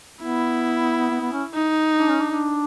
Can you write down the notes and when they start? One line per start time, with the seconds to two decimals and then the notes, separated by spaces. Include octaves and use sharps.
0.22 B3 E4
1.10 B3
1.21 B3
1.32 C#4
1.54 D#4
1.98 D4
2.09 C#4
2.20 D4
2.31 D4